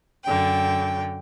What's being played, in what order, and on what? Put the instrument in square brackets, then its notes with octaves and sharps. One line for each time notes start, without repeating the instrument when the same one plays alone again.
[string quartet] F#2 D3 G5